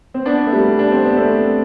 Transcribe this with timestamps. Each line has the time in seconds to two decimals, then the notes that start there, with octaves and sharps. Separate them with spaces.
0.14 C4
0.25 B3 D4
0.47 A3
0.52 G3 B3
0.79 D4
0.92 C4
1.04 B3
1.16 A3 C4